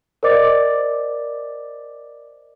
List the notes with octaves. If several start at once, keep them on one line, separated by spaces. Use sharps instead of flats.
A#4 C5 D5 D#5 D6 A6